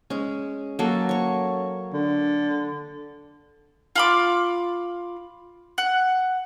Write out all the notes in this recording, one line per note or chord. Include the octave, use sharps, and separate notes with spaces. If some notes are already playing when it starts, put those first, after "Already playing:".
G#3 C#4
F#3 A#3 A4
C#5 C#6
D3
F4 B5 D6
F#5